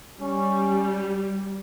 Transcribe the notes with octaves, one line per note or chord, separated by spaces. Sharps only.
G3 C#4